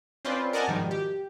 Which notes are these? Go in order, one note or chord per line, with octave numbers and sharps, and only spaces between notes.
C4 C#4 F4 B4 C5 D5
A#4 D5 D#5 F#5 G#5 A5
G#2 B2 D#3 F3 G3
G4